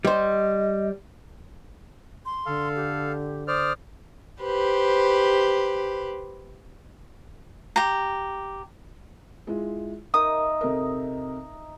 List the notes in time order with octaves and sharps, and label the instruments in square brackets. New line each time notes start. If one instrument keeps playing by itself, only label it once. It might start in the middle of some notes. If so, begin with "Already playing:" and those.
[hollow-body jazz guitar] G3 C5 [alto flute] D#5
[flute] C6
[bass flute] D3 [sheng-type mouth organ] A4 F5
[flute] G4
[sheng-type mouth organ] C5 D5 F6 [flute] D#6
[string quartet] G4 B4 C5
[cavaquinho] G4 A#5
[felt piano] G#3 E4 F4
[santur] D#4 E5 [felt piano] A#4 [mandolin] D#6
[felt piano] C3 A4 A#4